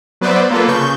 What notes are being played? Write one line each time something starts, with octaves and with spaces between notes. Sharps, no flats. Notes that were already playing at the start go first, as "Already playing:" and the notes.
F#3 B3 B4 C5 D5 E5
A#3 F4 A4 B4
C#3 C#6 G6